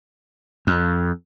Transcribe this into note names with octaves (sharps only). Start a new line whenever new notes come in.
F2